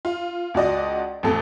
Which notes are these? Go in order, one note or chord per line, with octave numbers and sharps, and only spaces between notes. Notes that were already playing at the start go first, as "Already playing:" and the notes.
F4
C#2 F#4 D5 D#5
A1 F2 A4